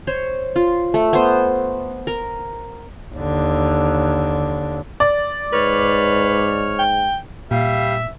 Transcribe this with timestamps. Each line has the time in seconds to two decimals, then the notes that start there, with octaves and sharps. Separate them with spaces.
0.07 C5 C#5
0.56 F4
0.94 A3
1.13 B3 C5
2.07 A#4
3.15 D#2 D3
5.00 D5
5.53 G#2 B4 C#5 F6
6.79 G5
7.51 A#2 G3 E5 F5